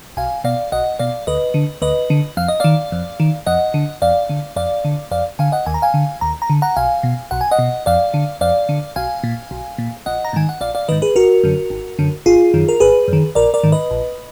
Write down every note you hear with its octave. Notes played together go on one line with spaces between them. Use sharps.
B1 F5 G#5
B2 D5 F5
B1 D#5 F#5
B2 D5 F5
D2 B4 D#5
D3
D2 B4 D#5
D3
F2 F5
D#5
D#3 D5 F5
F2
D#3
F2 D#5 F#5
D3
F2 D5 F5
D3
F2 D5 F5
D3
F2 D5 F5
D3 F5 G#5
D#5 F#5
D#2 G#5
A#5
F5 G#5
D3
D#2 A#5
A#5
D3
F#5 A#5
B1 F5 G#5
B2
B1 F#5
G#5
D#5 F#5
B2
F2 D5 F5
D3
F2 D5 F5
D3
B1 F5 G#5
A#2
B1
A#2
A#1 D#5 F#5
A#5
G#2 D#3 G#5
F#5
A#1 D5 F5
D5 F5
G#2 D#3 B4 D#5
G#4 B4
G#1 F#4 A#4
F#2 D3
G#1
F#2 D3
G#1 F4 G#4
F#2 D#3
A#4
G#1 G#4 B4
F#2 D#3
A#1 A#4 D5
A#4 D5
G#2 D#3
B4 D#5
A#1